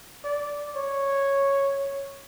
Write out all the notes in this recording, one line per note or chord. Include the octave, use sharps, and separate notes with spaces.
D5
C#5